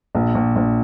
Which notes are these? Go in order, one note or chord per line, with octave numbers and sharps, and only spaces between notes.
A#1
A#1
A#1